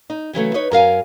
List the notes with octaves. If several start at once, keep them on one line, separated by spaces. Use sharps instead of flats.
D#4
C#3 E3 F#3 A3
D#4 B4 C#5
F#2 A#4 F5 G#5